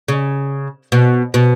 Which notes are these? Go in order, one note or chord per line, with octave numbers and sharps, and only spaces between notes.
C#3
B2
B2